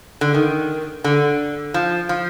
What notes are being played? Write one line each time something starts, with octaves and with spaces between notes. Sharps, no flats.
D3
D#3
D3
F3
F3